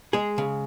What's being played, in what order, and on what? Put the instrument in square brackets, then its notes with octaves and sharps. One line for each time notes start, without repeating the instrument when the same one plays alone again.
[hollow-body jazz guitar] G#3 G#4
C#3